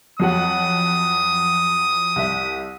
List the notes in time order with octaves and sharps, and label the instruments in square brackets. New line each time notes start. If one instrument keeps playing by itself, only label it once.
[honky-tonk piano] F2 F#3 F#5 [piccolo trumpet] D#6
[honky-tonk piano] C2 E5